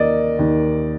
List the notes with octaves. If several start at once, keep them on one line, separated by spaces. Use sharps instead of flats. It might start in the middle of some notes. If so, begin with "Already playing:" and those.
Already playing: D#2 A#3 D5 D#5
D#2